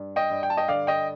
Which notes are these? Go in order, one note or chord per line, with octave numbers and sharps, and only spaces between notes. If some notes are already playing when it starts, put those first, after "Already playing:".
Already playing: G2
D#5 G5
G2
G5
A5
D#5 G5
D3 D5 F5
D#5 G5